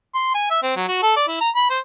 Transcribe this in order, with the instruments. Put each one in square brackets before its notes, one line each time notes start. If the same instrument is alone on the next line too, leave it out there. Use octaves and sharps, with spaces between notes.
[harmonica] C6
G#5
E5
C4
F#3
F#4
A4
D5
E4
A#5
B5
C5